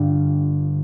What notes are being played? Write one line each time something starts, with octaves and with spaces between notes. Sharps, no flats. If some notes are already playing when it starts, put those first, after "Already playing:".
Already playing: G1 G2 D3 G3 F4